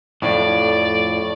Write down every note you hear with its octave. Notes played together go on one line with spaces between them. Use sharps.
F2 A2 D5